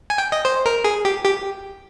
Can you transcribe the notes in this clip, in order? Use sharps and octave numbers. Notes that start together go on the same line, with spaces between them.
G#5
G5
D#5
C5
A#4
G#4
G4
G4